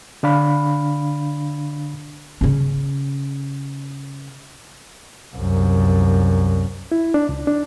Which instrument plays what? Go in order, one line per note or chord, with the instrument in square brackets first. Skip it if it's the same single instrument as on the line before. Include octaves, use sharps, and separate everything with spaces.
[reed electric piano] D3 D4 F5 B5
[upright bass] C#3 C#4
[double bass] C2 F#2
[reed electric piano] E4
D4
C#2
D4